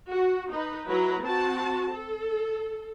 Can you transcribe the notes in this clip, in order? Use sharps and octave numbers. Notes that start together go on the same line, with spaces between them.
F#4
D#4 B4
F#3 E4 B4 A#5
C4 F#4 A5
A4